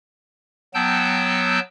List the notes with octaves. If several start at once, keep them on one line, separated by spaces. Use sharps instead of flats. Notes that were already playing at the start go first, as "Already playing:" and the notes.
F#3 B3 G5 A5 E6 G6